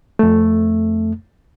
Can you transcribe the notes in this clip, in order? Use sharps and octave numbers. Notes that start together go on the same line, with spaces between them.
F2 A3